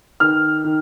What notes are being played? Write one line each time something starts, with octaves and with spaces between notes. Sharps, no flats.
D#3 F6
D#3